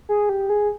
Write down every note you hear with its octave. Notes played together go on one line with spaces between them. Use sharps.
G#4
G4
G#4